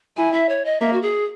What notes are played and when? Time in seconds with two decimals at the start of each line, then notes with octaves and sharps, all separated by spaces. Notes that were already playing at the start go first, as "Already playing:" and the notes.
0.17 E4 G#5
0.33 E5
0.49 C#5
0.65 D#5
0.81 A#3 E5
0.93 F#4
1.02 G#4